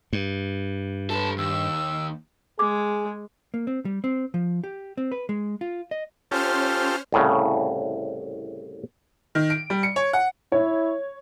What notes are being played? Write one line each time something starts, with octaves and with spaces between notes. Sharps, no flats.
G2
A4 B4 A5
D#2 E6
G#3 G#4 D6
A#3
C4
G3
C4
F3
G4
C4
B4
G#3
F4
D#5
C#4 F4 G4 A4 C5 F6
C2 A2 C#3
D#3
D7
G3
C#7
C#5
F#5
E4 C#5